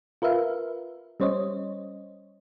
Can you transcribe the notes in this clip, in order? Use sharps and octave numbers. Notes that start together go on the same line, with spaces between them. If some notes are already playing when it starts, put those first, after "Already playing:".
F4 A#4 B4 E5 F5
G3 C#4 C5 C#5 D#5